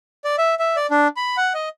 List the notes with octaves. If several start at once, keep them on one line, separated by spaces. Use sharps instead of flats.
D5
E5
E5
D5
D4
B5
F#5
D#5